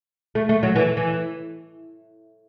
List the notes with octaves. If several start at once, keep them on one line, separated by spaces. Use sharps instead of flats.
A3
A3
F#3
E3
E3